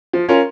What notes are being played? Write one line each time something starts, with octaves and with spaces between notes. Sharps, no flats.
F3
C#4 F4 A#4